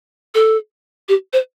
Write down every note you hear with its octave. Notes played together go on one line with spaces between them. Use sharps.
A4
G4
C5